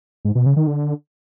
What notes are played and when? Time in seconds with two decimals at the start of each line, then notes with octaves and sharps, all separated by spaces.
0.25 G#2
0.35 B2
0.46 C#3
0.56 D#3
0.67 D3